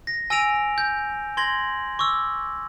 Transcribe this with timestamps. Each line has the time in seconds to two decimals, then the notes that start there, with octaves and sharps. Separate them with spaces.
0.07 A#6
0.30 G#5 E6 A#6 D7 D#7 F7
0.78 G6
1.37 C6 G#6 A#6 F#7
1.99 C#6 D6 E6